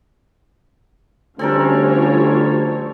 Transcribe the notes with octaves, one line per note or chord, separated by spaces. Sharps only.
D2 F3 G3 C4 C#4 A4 A#4 C#5